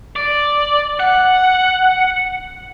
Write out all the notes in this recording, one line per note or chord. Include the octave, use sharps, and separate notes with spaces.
D5
F#5